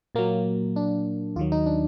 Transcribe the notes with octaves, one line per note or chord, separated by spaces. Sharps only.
A#2 F#3 A#3
D4
D#2 D#3 F#3 F4
D#4
D4